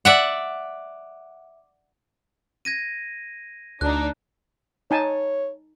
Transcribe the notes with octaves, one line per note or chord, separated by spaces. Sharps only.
D5 E5 F#5
G#6 A#6 D#7
D2 D4 D#4 F#6
D#4 C#5 G#5 A5